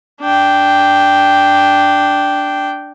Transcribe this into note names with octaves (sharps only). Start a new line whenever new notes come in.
D4 G5